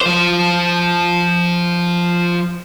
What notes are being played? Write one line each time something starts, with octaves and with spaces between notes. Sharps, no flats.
F3 C5